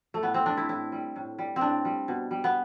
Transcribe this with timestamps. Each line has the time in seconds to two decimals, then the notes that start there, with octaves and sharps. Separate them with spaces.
0.14 A3
0.22 A2 B3
0.34 C4
0.46 G3 D4
0.57 E4
0.69 A2 E4
0.92 G3
1.16 A2
1.39 G3
1.56 C4
1.61 A2 D4
1.85 G3
2.08 B2
2.31 G3
2.44 B3